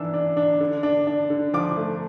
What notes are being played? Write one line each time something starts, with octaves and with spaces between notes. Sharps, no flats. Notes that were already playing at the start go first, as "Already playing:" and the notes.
Already playing: E3 D4 E6
D4
D4
D3
D4
D4
D3
F3 D6
A3